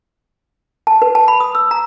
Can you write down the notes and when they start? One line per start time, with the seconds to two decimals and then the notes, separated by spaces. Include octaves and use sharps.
0.87 A5
1.02 B4
1.15 A5
1.28 B5
1.40 D#6
1.55 E6
1.71 A#5